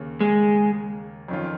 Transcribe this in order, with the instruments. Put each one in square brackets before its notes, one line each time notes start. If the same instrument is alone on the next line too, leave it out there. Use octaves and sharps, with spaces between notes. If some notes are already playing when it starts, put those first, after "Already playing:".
Already playing: [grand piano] D#2 C#3 A#3 C#4
[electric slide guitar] G#3
[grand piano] F2 D#3 C#4 F4